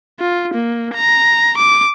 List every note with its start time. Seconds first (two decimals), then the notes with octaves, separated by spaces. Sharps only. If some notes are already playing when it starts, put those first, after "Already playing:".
0.20 F4
0.54 A#3
0.95 A#5
1.58 D6